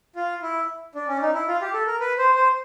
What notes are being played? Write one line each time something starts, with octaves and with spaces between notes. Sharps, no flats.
F4
E4
D4
C#4
D4
D#4
E4
F4
G4
A4
A#4
B4
C5
C5